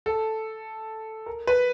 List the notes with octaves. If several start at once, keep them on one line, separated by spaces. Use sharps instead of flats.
A4
A#4
B4